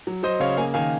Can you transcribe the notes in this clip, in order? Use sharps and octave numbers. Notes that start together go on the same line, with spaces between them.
F#3
F#3 C5 D#5
C#3 C#5 F5
A#3 F5 G#5
D#3 F5 G#5